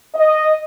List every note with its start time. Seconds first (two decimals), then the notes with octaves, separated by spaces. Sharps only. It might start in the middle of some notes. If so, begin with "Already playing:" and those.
0.14 D#5